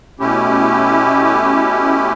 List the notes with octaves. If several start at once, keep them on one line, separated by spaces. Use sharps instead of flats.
B2 A3 C#4 E4 G4